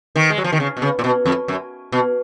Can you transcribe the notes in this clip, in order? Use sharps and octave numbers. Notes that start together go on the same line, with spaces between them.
D#3
G#3
F#3
F3
D#3
C#3
B2
C#3
A#2
B2
F2
F#2
B2